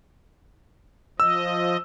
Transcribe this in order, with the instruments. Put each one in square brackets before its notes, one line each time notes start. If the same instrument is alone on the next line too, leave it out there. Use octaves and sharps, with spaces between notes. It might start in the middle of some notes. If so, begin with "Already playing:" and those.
[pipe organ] F3 D#5 [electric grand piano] E6